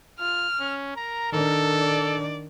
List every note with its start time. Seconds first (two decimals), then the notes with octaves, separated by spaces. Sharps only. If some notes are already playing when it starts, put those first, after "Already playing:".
0.19 F4 F6
0.60 C#4
0.96 A#4 A#5
1.33 D#3 D4 A4
1.79 D5